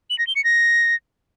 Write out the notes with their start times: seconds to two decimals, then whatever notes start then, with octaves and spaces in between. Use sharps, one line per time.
0.10 F#7
0.19 A#6
0.27 G7
0.36 C#7
0.44 A#6